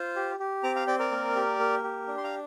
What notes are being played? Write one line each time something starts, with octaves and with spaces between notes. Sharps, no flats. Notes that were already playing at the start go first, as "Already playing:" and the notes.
Already playing: F4 C5
G4
G4
C4 A#5 D6
F5 A#5
C4 D5 G5
A#4 D5
A#3
G4
A#3
G4
D4
C6
F5 A#5